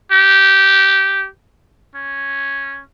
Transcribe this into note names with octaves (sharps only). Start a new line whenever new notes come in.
G4
C#4